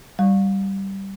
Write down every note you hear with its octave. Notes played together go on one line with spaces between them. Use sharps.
G3